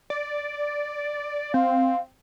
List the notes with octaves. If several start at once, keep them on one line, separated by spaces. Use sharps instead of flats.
D5
C4 F5